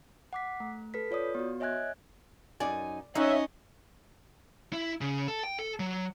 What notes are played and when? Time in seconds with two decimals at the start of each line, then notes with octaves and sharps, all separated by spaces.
0.33 F#5 D6 B6
0.60 A3
0.94 A4 B4 B6
1.11 F4 C#5 D5 D#6
1.35 B3 F#4
1.60 C#5 D#5 E5 G#5 F#6 G#6
2.60 F#2 D#4 D5 G#5
3.15 F2 C#4 D#4 C#5 D#5 E5 F#5
4.73 E4
5.01 C#3
5.28 A4
5.44 G5
5.59 A4
5.80 F#3